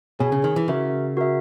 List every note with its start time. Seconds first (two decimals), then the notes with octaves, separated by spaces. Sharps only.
0.20 B2 G#4 C#5 G#5
0.32 C#3
0.44 D#3
0.56 E3
0.68 C#3 F#4 A#4 E5
1.17 F#4 A#4 E5